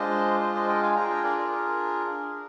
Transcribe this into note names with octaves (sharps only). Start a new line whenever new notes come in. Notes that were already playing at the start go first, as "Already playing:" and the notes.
Already playing: G#3 D4 F4 C5 D#5
C5 D#5
C5 D#5
D#5 G5
F5 G#5
D4 F4 G#4 G5 A#5
G5 A#5
A#4 D5
A#4
A#4
D4 G#4